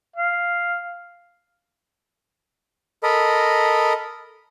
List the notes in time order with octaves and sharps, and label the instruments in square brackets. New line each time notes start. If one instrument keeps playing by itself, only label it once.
[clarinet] F5
[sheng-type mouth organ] A4 A#4 D#5 B5